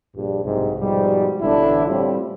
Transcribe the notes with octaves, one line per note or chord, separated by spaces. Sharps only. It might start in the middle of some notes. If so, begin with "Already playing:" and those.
A#1 G2
B1 G#2 C3
G#2 B2 F3 G3
A1 B2 D3 E3 D4 E4
A2 G3 C4 C#4 E4 F4